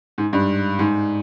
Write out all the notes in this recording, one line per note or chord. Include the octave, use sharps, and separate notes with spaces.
G#2
G2
G#2